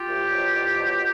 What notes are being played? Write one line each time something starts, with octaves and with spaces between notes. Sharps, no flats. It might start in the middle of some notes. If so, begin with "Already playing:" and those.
Already playing: F4 G4
C2
B2 F#3
C2
B2 F#3